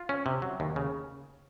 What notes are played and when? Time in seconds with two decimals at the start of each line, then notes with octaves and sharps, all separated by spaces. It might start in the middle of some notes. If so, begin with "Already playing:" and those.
Already playing: F4
0.09 C#4
0.26 C3
0.42 F#3
0.60 D#2
0.76 C#3